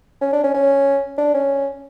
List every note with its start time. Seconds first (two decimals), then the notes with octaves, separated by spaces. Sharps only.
0.21 C#4
0.33 D4
0.44 C#4
0.54 C#4
1.18 D4
1.34 C#4